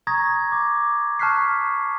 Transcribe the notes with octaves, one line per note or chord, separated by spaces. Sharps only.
A#5 C#6 D#6 G#6 A#6
D6
A5 C#6 F6 F#6 B6 C7